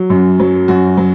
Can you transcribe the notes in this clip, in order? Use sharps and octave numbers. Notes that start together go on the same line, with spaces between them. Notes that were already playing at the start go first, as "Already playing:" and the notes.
Already playing: F#3
F#2
F#3
F#2 F#4
F#3